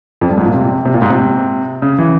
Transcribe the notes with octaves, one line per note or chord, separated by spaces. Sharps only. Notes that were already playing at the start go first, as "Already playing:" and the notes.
F2
G2
G#2
A#2
C3
C3
A#2
G#2
C3
C#3
E3